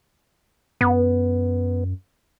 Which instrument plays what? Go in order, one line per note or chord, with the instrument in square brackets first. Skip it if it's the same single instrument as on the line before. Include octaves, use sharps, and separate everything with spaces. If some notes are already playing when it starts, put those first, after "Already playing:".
[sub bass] F#2 [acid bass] B3